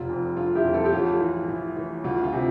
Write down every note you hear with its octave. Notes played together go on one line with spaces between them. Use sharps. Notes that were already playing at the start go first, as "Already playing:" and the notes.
Already playing: F1 F4
F2
D3 F4
E4 G4
F2
F4 A4
G4
A1 F4
E3
A2
E3
D2 F4
F4
C3